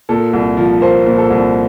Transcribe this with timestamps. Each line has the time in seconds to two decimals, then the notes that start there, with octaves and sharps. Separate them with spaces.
0.09 A#2 A4
0.33 C2
0.57 F3
0.81 A#3 C5
1.06 A#2
1.18 A4
1.30 C2